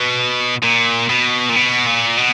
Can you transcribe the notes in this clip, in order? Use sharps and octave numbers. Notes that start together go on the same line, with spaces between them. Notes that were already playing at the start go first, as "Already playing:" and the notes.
Already playing: B2
A#2
B2
A#2
B2
A#2
B2